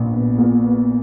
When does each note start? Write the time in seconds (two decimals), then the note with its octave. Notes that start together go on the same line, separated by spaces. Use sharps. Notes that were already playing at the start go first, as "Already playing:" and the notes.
Already playing: A#1 A#2 B3
0.13 B3
0.38 A#2
0.62 B3